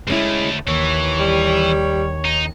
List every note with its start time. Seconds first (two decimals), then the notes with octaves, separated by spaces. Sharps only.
0.08 D2 G#3 A3 C#4 E4
0.68 D#2 E3 C#5
1.20 G3
2.25 D#4